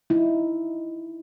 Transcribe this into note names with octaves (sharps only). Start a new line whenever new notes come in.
D#4 E4